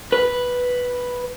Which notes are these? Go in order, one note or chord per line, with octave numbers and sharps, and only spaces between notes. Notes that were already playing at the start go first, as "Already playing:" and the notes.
B4